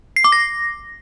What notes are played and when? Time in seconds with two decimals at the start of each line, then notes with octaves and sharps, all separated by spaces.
0.16 C7
0.24 D6
0.32 A#6